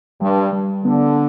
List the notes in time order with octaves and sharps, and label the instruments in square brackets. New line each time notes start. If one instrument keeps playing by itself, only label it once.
[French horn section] G2 [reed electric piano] G3
[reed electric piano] G3
[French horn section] D3 [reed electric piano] B3